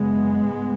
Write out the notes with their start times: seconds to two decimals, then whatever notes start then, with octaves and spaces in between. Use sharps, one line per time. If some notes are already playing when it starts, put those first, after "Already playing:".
Already playing: F#2 C#3 G#3 B3
0.44 G#2